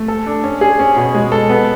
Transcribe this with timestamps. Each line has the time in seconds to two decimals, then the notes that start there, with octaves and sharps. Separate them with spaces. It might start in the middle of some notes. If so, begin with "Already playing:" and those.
Already playing: A3
0.08 A4
0.26 D4
0.44 C#4
0.61 G#4
0.79 C#4
0.96 B2
1.14 G#3
1.32 A4
1.49 B3